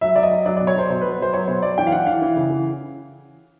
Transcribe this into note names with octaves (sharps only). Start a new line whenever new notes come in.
F#3 E5
F#3 D5
D#5
F#3
F#3 D5
B2 D5
C#5
F#3 C5
B2 C5
B4
F#3
B4
F#3 C5
F#3 C#5
B2 C5
F#3 D5
E3 G5
F5
E3 F#5
E3 F5
E3
C#3
E3